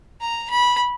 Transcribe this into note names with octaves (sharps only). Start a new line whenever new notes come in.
A#5
B5